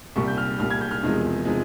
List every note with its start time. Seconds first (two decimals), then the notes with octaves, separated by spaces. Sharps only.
0.16 C2 A#2 G3 C#6
0.28 G6
0.38 F6
0.59 C2 A#2 G3 F6
0.70 G#6
0.81 G6
0.91 F6
1.03 E1 E2 C3 F3 G#3
1.45 C3 F3 G#3